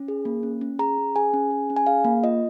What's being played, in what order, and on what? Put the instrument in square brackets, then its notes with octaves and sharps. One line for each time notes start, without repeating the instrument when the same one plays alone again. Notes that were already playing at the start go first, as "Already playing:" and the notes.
Already playing: [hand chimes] C#4
G#4
A#3
C#4
C#4
G#4 A#5
C#4
G#4 G#5
C#4
G#4
C#4
G#5
G#4 F5
A#3
F4 D#5